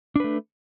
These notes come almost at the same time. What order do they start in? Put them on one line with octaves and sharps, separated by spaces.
D4 B4 A3